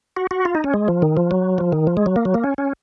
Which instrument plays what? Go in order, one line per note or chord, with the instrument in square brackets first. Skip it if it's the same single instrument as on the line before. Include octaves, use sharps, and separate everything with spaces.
[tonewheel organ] F#4
F#4
F4
D#4
C#4
G#3
F3
D#3
F3
F#3
F3
D#3
F3
G#3
F#3
A#3
F#3
A#3
C#4
C#4